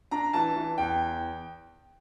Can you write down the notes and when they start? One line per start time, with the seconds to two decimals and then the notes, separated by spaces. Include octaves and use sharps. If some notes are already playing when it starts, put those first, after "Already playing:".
0.11 D4 A#5
0.33 E3 A5
0.56 E3
0.78 E2 G5